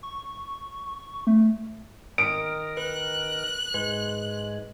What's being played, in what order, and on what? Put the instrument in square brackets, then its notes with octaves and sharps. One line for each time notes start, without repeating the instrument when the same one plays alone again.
[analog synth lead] C#6
A3
[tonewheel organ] D#3 A#4 [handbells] D#6 [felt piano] D7
[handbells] B4 [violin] F#6
[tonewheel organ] G#2 G#3 [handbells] B4